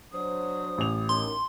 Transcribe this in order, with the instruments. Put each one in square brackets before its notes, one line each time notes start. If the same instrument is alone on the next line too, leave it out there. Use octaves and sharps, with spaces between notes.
[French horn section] F#3 D4 C5 [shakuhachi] D#6
[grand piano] A1 F7
[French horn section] C#4 D#4 A#4 [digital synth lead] C6